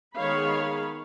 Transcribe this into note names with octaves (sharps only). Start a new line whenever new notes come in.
D#3 G#3 B3 C#5 F5 B5